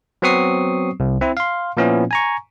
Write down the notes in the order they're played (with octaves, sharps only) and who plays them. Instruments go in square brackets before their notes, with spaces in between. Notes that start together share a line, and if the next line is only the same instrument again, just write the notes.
[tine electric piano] F#3 B3 C4 C#6 D#6 C7
C2
C4 E4
F5 C6
A#2 F3 B3 C#4 E4
G#5 A#5 C#6